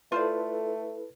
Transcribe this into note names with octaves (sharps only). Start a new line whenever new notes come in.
A3 E4 F4 A4 B4 C5 D5